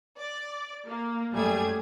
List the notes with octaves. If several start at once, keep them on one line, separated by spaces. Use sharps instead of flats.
D5
A#3
F#2 G3 A3 G#4 G#6